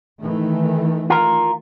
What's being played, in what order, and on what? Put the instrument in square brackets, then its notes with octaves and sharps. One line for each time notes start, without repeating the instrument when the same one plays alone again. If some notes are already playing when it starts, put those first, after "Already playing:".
[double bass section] D#3 E3 A3
[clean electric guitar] F4 A#4